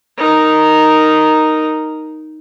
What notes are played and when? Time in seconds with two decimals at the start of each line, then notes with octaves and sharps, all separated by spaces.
0.18 D#4 A#4